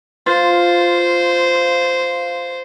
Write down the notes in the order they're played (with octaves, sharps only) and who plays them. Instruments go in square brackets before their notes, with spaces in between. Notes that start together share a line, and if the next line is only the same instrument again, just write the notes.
[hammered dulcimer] F4 [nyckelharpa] C5